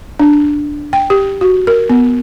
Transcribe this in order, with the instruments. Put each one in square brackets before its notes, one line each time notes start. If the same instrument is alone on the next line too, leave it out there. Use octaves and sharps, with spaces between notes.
[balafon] D4
G5
G4
F#4
A#4
B3